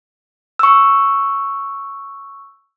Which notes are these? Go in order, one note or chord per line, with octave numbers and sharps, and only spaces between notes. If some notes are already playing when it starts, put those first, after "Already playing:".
C#6 E6